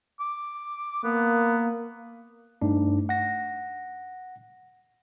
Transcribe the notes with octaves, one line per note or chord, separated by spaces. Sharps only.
D6
A#3 B3
G2 A3 D4 D#4
F#5 A#6